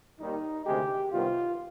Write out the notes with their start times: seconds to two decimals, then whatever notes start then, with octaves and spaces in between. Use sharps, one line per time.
0.20 D#2 D#3 G3 D#4
0.65 D2 C3 D#3 G#3 G4
1.11 C2 C3 D#3 G3 B3 F4